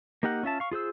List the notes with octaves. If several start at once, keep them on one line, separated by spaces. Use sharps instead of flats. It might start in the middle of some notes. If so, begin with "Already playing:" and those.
A#3 D#4 G4 A#4 F#5
C#4 F4 E5 A5
F5 C#6
F4 G#4 C5 E6